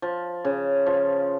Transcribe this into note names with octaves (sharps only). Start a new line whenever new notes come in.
F3
C#3
F3